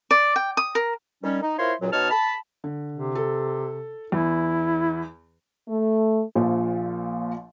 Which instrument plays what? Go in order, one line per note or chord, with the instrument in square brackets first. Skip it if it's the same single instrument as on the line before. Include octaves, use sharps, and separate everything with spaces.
[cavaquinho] D5
G5
D#6
A#4
[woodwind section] D#3 G3 C#4
D#4
E4 F4 A#4 C5 C#5 C6
C#2 F#2 A#2 F#3
B2 D#4 C#5 A5 F6
A5 B5
[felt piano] D3
[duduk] C3
[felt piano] A4
[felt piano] E2 [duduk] E4
[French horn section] A3
[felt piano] A#1 A#2 F3